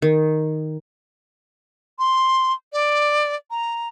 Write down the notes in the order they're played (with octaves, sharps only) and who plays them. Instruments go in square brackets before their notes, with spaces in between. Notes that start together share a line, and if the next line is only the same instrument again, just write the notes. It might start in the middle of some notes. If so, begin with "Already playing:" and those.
[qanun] D#3
[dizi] C6
D5
A#5